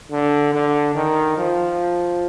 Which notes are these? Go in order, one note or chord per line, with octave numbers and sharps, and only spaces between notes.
D3
D3
D#3
F3